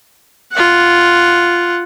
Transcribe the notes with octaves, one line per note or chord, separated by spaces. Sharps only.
F4 F#5